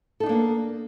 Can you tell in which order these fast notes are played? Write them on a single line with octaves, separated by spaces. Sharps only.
A4 D#4 D4 A#3 B3